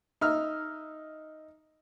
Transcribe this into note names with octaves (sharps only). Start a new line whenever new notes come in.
D#4 E5 F6